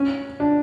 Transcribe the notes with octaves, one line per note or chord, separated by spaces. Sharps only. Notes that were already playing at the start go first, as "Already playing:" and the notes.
Already playing: C#4
D4